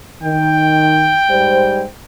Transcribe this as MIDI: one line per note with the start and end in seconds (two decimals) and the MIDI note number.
0.23 1.19 51
0.23 1.88 79
1.30 1.84 44
1.30 1.84 55
1.30 1.84 72